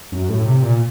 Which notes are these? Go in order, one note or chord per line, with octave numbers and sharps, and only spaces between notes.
F#2
A2
C3
A#2